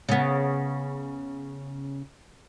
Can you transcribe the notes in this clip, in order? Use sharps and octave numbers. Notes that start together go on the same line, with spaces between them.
C#3 B3